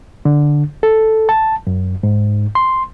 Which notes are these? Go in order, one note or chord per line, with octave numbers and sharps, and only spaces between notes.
D3
A4
A5
F#2
G#2
C6